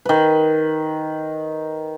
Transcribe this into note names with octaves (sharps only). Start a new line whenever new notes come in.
D#3 B4